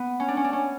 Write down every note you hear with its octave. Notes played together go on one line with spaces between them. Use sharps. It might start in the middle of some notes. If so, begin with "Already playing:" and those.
Already playing: B3
C#4
D4
C#4
D4
C#4